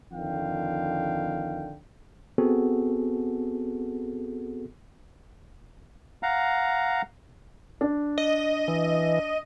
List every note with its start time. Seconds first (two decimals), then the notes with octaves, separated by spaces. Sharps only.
0.12 F2 D3 D#3 F5 G5
2.38 B3 C4 F#4 G#4 A4
6.23 F5 F#5 A#5
7.81 D4
8.18 D#5
8.68 E3